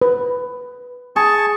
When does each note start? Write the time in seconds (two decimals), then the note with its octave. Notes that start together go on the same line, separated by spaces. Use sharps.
0.02 B4
1.16 G#4 A5 C#6